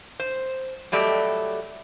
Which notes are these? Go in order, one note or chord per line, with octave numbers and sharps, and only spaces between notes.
C5
F#3 G3 A3 G4 D5 D#5